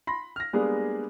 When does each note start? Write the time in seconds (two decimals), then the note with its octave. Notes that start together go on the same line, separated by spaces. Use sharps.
0.07 B5 C6 A#6
0.36 F6 A#6
0.53 G3 G#3 A#3 B3 D4 G#4